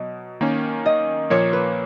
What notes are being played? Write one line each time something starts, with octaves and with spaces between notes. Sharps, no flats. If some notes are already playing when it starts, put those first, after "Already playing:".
Already playing: B2 F#3 D#5
D#3 A#3 C#4
D#5
A#2 F3 A#3 C#5
B4